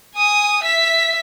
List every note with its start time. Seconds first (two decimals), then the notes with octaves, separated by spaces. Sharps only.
0.16 G#5 D#6
0.63 E5 B6